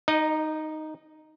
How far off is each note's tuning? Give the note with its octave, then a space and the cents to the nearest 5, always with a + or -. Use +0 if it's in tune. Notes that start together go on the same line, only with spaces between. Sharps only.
D#4 +0 D#5 -35